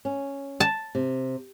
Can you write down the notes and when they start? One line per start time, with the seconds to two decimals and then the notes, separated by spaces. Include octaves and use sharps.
0.05 C#4
0.60 A5
0.95 C3